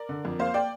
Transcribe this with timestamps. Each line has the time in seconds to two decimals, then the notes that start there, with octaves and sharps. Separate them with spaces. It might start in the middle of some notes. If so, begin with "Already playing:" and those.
Already playing: A#4 D5
0.09 D3
0.25 F2
0.39 A#3 C5 F5
0.54 D5 G5